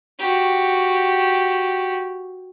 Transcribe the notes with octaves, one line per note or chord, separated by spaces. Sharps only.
F#4 G4